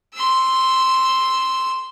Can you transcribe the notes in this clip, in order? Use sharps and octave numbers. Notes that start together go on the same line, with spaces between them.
C6 E6